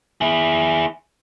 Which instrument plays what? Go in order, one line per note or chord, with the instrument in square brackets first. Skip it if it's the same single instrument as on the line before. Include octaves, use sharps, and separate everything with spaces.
[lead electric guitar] E4 G#4